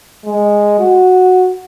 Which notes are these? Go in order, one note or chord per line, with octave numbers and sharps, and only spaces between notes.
G#3
F#4